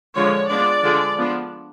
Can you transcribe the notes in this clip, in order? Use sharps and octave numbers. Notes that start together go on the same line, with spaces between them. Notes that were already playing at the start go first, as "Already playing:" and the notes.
D3 F3 G#3 D4 C#5
F3 G#3 B3 D4 D5
D3 F3 G#3 D4
F3 B3 D4